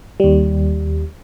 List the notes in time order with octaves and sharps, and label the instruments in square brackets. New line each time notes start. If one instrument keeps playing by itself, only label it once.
[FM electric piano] D#2 G3